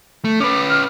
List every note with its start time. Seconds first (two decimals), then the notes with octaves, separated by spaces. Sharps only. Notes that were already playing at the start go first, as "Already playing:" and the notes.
0.25 A3
0.40 C#4 B4 D6
0.69 F6